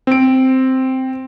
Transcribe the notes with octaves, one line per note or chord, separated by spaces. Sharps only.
C4 D7